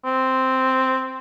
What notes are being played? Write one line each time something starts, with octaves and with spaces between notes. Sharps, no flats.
C4